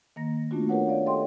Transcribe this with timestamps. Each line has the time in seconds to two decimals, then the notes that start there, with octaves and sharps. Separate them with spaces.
0.16 D#3 A#3 A#6
0.51 A3 B3 C#4 D4 F4 F#4
0.69 G4 A#4 B4 C#5 F#5
0.88 C#5 D5 F5
1.06 A4 D#5 G5 C6